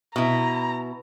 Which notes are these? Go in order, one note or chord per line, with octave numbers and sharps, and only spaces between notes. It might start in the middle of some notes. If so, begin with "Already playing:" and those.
B2 E4 A#5